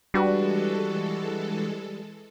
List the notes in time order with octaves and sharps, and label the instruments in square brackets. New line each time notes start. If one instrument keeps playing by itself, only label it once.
[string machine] E3 G#3 A4 [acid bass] G3 [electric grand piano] D4 F#4 B4